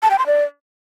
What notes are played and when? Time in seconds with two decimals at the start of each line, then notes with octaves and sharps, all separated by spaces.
0.03 A5
0.11 G5
0.19 C6
0.26 D5